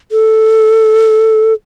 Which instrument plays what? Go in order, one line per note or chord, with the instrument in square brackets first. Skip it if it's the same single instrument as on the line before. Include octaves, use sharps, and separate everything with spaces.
[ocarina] A4